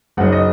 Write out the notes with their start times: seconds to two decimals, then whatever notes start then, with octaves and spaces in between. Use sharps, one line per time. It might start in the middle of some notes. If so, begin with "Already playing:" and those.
0.17 F#1 F#2 F#3 D#4 F#5
0.32 D#5